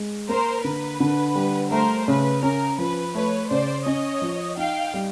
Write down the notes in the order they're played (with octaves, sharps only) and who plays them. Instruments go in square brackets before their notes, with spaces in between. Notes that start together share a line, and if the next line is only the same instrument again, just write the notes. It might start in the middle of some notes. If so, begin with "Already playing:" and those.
Already playing: [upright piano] G#3
[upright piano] A#3 [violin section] A#4 C5
[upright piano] D3 [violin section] B4
[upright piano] D3
G3
[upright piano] A3 [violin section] A#4 C5
[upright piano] C#3 [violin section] B4
[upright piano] C#4 [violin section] A#4
[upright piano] F3 [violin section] B4
[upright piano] A3 [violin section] B4 C#5
[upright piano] C#3 [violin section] C5 D5
[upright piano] C#4 [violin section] C#5 D#5
[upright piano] F3
[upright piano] D#4 [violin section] F5 G5
[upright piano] G3